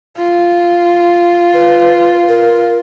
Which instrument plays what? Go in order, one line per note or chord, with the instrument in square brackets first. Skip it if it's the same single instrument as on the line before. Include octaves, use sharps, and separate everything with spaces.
[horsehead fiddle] F4
[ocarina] B4
A#4